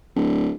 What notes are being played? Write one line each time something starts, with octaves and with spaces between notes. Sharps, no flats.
D1